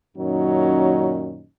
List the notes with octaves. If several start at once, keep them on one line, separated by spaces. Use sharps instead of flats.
F#2 A#2 D#3 F#3 C#4 D#4